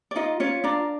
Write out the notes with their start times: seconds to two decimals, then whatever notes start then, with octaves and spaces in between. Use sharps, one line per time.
0.11 D5
0.16 D#4 F4 D#5
0.40 C#4 F4 C#5
0.64 D4 A#4 D5